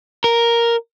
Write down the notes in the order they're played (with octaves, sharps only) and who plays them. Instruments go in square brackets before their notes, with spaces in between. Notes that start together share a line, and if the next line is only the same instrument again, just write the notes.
[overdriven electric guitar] A#4